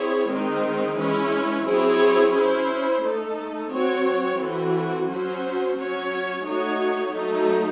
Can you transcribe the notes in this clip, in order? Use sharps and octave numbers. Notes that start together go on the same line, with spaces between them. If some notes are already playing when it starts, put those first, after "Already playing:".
Already playing: C4 E4 G#4 C#5
D#3 G#3 C4 D#4
E3 G#3 C#4 E4
F#3 C4 E4 G#4 C#5
C#4 E4 C5
A3 D#4 A4
F#3 C4 F#4 C#5
E3 C4 F#4 A4
F#3 C#4 F#4 C5
F#3 C#4 F#4 C#5
A3 D#4 F#4 C#5
F#3 A3 D#4 A4